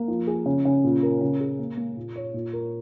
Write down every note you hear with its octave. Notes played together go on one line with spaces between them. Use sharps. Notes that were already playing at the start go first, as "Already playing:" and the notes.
Already playing: A#3
F3
G#4
C#3
C#3
A#2
A#4
C#3
G#4
A#3
A#3
A#2
C#5
A#2
A#4